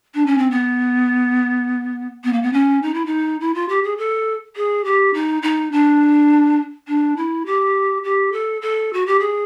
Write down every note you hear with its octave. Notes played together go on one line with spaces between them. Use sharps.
D4
C#4
C4
B3
B3
A#3
B3
C#4
D#4
E4
D#4
E4
F4
G4
G#4
A4
G#4
G4
D#4
D#4
D4
D4
E4
G4
G4
A4
A4
F#4
G4
G#4